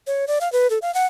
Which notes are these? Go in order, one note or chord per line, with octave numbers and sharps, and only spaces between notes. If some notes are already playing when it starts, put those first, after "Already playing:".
C#5
D5
F5
B4
A4
F5
F#5